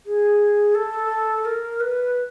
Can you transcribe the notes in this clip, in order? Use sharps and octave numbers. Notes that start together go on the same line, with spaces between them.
G#4
A4
A#4
B4